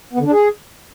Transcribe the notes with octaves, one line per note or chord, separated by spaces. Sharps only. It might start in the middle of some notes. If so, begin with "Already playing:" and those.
B3
D3
D4
G#4